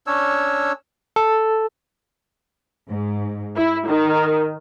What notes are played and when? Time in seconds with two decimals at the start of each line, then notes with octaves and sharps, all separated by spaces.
0.07 C#4 D4 C#5 E6
1.16 A4
2.89 G#2
3.56 E4
3.88 D#3